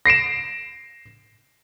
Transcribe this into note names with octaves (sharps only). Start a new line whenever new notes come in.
A#6 C7 D7 E7